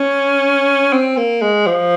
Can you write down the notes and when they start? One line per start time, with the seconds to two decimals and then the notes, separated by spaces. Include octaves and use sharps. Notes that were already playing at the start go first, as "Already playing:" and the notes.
Already playing: C#4
0.93 C4
1.17 A#3
1.42 G#3
1.67 F3